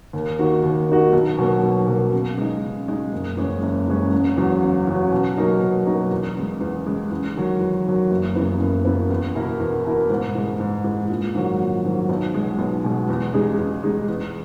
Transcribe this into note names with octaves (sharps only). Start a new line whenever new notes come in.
D#2
D#3 A#3 D#4 F#4
D#2
D#3 A#3 D#4 F#4
B1
B2 F#3 A#3
B1
B2 F#3 A#3
C#3
G#3 D#4
C#3
G#3 D#4
F#1
E2 C#3 G#3 C#4
F#1
E2 C#3 G#3 C#4
E1
E2 C#3 F#3
E1
E2 C#3 F#3
B2
F#3 A#3 D#4 A#4
B2
F#3 A#3 D#4 A#4
E2
C#3 G#3
E2
C#3 G#3
E2
D#3 F#3
E2
D#3 F#3
F#1
F#2 C#3 E3 B3
F#1
F#2 C#3 E3 B3
E2
B2 A#3 E4 A#4
E2
B2 A#3 E4 A#4
G#2
E3 G#3
G#2
E3 G#3
A#1
G#2 D#3 F#3
A#1
G#2 D#3 F#3
B1
B2 G#3
B1
B2 G#3
E2
C#3 G#3 D#4 G#4
E2
C#3 G#3 D#4 G#4
E2